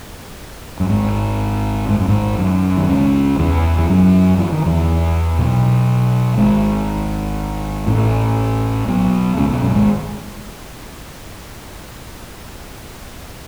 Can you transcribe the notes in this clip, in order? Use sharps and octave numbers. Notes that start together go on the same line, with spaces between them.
F#2
G#1 G#2
G#2
F#2
G#1 G#2
F#2
D#3
C#2 C#3
E2 E3
E3
F#2 F#3
E3
D#3
E2 E3
B1 B2
G#1 G#2
A1 A2
B1 B2
C#2 C#3
B1 B2
F#2
G#1 G#2